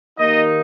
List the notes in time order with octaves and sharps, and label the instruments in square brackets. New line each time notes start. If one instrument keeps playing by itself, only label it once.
[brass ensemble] D#2 D#3 A#3 D#4 D#5